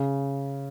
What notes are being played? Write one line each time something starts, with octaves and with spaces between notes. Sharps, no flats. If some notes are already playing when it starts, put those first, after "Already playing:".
Already playing: C#3